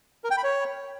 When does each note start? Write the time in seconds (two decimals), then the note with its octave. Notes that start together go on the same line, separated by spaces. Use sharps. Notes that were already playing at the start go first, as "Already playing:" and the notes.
0.24 A#4
0.31 G5
0.37 B5
0.44 C#5